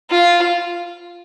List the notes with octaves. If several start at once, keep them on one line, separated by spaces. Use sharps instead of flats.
F4